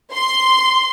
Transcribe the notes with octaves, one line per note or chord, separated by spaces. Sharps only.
C6